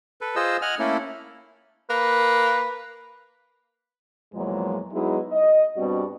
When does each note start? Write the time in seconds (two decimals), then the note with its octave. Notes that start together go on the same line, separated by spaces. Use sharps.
0.21 A4 B4
0.36 F4 G#4 C5 D#5 E6
0.62 D#5 F#5 G#5 F6
0.79 A3 A#3 C#4 E4 A4
1.90 A#3 B4
4.33 E2 A#2 F3 F#3 G#3
4.92 F#3 G#3 B3 D#4 E4 G#4
5.32 D#5
5.77 G2 B2 G3 C4 F#4 D5